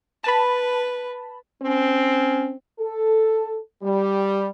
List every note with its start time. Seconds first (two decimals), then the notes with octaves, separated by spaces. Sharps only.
0.24 B4 A5 B5
1.62 C4 C#4
2.80 A4
3.83 G3